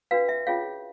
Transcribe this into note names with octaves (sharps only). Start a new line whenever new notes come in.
D4 F#4 B4 F5
E5
C#4 F4 G#4 C#5 F5